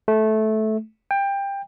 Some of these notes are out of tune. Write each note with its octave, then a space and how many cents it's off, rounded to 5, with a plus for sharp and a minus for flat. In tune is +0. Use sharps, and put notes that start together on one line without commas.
A3 -15
G5 +20